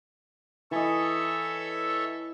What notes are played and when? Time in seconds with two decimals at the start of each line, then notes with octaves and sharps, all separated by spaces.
0.71 E3 A4 C#5 D#5 E5